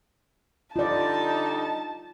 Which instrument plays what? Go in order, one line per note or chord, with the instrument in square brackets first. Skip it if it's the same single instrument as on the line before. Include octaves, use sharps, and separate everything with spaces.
[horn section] D3 G3 D#4 [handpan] F4 D5 [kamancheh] A5